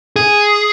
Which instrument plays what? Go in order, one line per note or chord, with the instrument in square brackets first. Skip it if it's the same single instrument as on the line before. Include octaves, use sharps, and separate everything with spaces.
[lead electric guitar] G#4